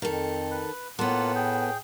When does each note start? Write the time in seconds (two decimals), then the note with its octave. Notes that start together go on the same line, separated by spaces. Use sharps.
0.02 F2 D#3 A4
0.51 B4
0.99 A2 A#3 B3 F4 A4 F#5
1.35 G#4 G5